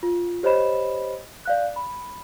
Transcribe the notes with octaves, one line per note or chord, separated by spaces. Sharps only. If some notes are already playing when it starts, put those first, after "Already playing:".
F4
G4 C5 C#5 D#5 B5 E7
D5 F5 F#6
B5